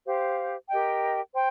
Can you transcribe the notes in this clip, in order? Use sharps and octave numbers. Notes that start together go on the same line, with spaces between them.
G4 C5 F5
G4 A#4 D#5 G5
C5 G5